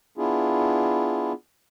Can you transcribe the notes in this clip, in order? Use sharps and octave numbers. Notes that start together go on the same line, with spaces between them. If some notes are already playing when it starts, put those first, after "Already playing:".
B3 D4 E4 F4 G#4